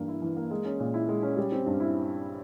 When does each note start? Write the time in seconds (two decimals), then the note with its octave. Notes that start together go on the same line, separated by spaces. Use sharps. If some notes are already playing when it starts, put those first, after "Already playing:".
Already playing: G2 E3 A#3
0.08 E4
0.22 E3
0.37 A#3
0.51 G#3
0.65 C#4
0.80 A#2
0.94 E4
1.09 G#3
1.23 C#4
1.37 G3
1.52 C4
1.66 G2
1.80 E4